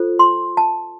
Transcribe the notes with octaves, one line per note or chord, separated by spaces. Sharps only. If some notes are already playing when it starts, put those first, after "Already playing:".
Already playing: F4 A4 C5
C6
A5